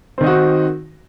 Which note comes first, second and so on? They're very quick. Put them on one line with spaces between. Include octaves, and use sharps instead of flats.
C4 D#3 D#4 F#4